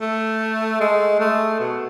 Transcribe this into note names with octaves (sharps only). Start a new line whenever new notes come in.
A3
G#3
A3
B2